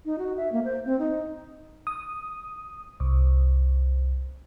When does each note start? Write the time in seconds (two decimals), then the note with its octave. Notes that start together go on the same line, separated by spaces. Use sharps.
0.05 D#4
0.18 F#4
0.37 E5
0.52 A#3
0.65 C5
0.85 C4
0.99 D#4
1.87 D#6
3.00 C2